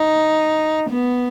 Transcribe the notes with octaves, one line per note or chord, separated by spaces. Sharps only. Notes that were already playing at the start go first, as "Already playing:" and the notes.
Already playing: D#4
B3